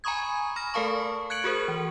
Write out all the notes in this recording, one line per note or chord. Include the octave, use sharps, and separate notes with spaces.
G#5 A#5 B5 C#6 D#6 G#6
B5 F6 A#6
A3 A4 A#4 F5 A5 C#6
F#6 G#6 C#7 D7 F#7
F#4 G#4 A#4 C5
E3